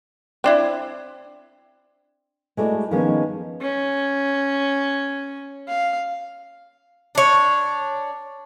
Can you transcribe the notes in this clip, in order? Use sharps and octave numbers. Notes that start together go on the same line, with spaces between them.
C4 D4 E4
G#3 A3 E4 F#4 D5
D#3 F3 G#3 A#3 B3 C#4
C#4
F5
D4 C#5